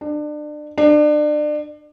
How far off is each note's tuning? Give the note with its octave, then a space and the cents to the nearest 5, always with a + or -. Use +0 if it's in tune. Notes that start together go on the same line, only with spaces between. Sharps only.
D4 +30
D4 +30